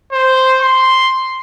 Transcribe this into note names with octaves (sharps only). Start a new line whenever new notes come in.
C5
C6